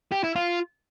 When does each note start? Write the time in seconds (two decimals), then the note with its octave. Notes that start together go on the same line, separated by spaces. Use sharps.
0.12 G4
0.24 E4
0.36 F4